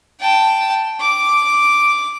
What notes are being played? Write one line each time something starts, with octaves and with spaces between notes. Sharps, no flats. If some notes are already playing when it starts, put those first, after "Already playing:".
G5 A5
D6